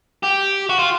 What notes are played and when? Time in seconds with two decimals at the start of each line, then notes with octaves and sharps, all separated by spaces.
0.23 G4
0.69 F#4
0.79 F4